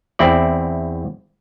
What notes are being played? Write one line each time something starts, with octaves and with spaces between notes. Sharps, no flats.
E2 C4 E4 D5